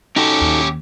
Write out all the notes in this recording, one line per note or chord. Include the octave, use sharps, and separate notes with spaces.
C#4 D#4 F#4 G4 A4
D#2